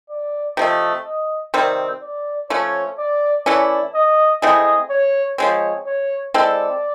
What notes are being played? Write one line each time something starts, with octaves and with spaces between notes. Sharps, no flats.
D5
C3 F3 A3 D#5
D#5
C3 D#3 G3 C4
D5
F3 A3 C#4 C#5
D5
E3 A3 C#4 E4 D5
D#5
A3 C4 E4 G#4 D#5
C#5
F3 G#3 C4 C#5
C#5
G#3 C4 E4 A4 D5